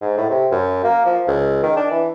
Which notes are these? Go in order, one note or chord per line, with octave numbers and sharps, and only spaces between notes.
G#2
A2
C3
F#2
A#3
F3
C#2
D#3
D4
E3